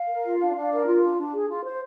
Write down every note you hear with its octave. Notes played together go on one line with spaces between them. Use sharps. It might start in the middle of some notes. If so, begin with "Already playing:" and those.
Already playing: F5
A#4
F4
D4
D4
A#4
F4
D4
D4
G#4
F4
C5